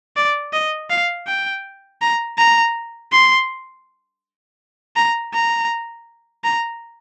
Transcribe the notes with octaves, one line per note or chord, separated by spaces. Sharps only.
D5
D#5
F5
G5
A#5
A#5
C6
A#5
A#5
A#5